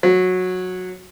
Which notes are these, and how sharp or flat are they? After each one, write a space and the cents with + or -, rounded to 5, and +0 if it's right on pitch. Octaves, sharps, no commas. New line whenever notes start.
F#3 -15